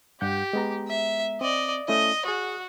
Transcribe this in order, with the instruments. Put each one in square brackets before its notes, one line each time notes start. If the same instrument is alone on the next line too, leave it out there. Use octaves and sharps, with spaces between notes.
[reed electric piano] G2 F#5 G6 [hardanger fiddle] G4
[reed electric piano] G#3 B3 A#5
[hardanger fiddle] E5
[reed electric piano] C4 [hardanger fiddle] D5 D#5
[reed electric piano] A3 C#4 E4 [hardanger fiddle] D#5
[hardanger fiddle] F#4 [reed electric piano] G#4 D#6